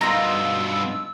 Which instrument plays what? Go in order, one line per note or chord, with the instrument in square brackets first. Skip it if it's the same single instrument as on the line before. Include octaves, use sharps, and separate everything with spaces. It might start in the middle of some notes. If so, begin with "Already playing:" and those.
[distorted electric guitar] G2 B2 [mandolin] D#4 F4 [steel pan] A#5 [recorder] E6